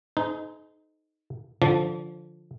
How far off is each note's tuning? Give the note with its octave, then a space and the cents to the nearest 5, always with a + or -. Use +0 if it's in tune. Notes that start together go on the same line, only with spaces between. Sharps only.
D#4 +0 G#4 +40 C5 -35
D3 +0 F3 +0 D5 -35